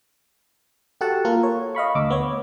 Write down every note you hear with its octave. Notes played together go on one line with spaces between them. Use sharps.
F#4 G4 A4 F#5 A5
A#3 F4 A4 A#4
C#5
D#5 F5 B5 C#6
D2 D6 E6
B3 C#5